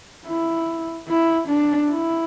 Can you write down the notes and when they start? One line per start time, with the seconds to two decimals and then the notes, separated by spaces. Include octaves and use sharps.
0.26 E4
1.08 E4
1.48 D4
1.90 E4